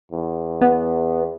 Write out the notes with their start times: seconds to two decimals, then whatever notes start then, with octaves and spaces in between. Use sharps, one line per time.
0.12 E2
0.61 B3